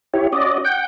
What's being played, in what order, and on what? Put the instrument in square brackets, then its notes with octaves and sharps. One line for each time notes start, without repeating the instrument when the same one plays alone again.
[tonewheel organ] E4 G4 C#5
C#4 F#4 D5 D#5
F#5 G5 G6